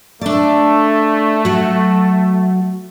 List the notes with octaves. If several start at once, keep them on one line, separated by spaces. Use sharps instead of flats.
A3 D4 D5
F#3 F#4